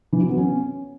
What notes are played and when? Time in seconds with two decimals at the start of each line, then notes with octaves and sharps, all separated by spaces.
0.13 E3
0.21 F#3
0.29 B3
0.37 C#4